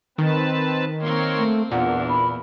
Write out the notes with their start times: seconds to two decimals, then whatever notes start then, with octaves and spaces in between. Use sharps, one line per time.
0.18 D#3 C4 B4 A5
1.00 A#3 C4 A#4 C#5 C6
1.37 A3
1.71 E2 A#2 D4 F#5
2.09 B5